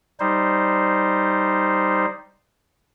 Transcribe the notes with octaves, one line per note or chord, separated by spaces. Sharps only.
G3 D#4 C5